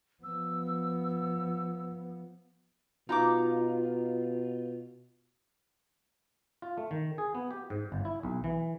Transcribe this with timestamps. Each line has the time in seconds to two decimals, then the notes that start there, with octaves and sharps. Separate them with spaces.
0.24 F3 B3 E6
3.09 B2 D#4 F4 A#5 D6
6.62 F4
6.78 A3
6.91 D#3
7.18 G#4
7.35 B3
7.51 G4
7.70 G#2
7.92 G1
8.05 E4
8.23 B1
8.44 E3